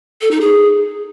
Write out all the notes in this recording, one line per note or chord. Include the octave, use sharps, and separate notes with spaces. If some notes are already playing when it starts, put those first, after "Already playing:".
A4
D#4
G#4